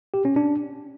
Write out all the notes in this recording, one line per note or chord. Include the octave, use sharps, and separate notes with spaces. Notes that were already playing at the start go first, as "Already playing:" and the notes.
G4
C#4
D4